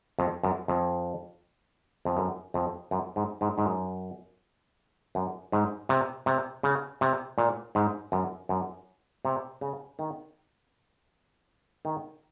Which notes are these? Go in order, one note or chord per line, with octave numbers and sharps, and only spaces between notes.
F2
F#2
F2
F2
F#2
F2
F#2
G#2
G#2
G#2
F#2
F#2
G#2
C3
C3
C#3
C3
A#2
G#2
F#2
F#2
C3
C#3
D#3
D#3